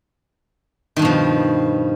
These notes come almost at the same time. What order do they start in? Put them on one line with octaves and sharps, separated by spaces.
D#3 G2 B2 F3